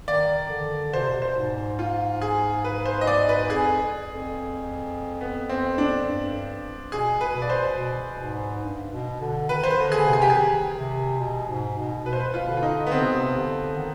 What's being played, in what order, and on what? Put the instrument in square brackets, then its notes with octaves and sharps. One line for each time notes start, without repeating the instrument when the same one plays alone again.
[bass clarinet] D#3 [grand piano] D5
[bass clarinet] D3
[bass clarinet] B2 [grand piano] C5
[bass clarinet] C3
B2
[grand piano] C5
[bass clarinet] G#2
[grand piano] F4
G#4
B4
C5
D#5
D5
B4
[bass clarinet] F2 [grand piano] G#4
[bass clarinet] F2
[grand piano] B3
C4
D4
[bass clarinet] G2
[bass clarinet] B2 [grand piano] G#4
[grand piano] B4
[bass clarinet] B2
[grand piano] D5
C5
[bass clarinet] B2
G#2
G2
B2
D3
[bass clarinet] D#3 [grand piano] B4
[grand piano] C5
B4
[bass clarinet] D3
[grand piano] G#4
[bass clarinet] C3
[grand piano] G#4
G4
[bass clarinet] D#3 [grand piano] G#4
[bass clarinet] C3
B2
G#2
B2
[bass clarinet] B2 [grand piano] B4
[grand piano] C5
B4
F4
[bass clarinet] D3
[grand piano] F4
D#4
B3
[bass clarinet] D3 [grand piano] C4
[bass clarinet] C3
B2
C3
D3
D#3